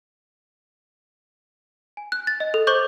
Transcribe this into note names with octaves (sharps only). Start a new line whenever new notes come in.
G#5
F#6
A6
D#5
A4
C5 C#6 D6 G6